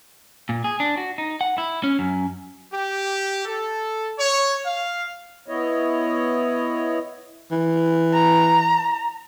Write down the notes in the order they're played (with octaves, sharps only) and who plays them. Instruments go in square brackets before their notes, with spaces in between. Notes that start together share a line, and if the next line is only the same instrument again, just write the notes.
[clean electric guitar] A#2
G#4
D4
F#4
D#4
F#5
E4
C#4
F#2
[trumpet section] G4
A4
C#5
F5
[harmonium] B3 E4 C#5 D#5
[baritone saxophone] E3
[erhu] A#5